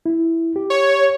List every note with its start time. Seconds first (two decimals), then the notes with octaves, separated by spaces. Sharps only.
0.06 E4
0.56 G4
0.70 C#5